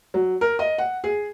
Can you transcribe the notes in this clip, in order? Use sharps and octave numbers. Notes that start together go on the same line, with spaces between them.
F#3
A#4
D#5
F#5
G#4